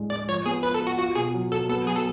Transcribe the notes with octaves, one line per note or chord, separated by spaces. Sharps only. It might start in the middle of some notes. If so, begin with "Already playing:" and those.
Already playing: A2 G#3 D4
G#3 D5
F3 C#5
B3 G#4
F4 B4
A4
F4
F#4
F4 F#4
B2 G#4
F#3
F#3 A4
B3 A4
F#3 G#4
A4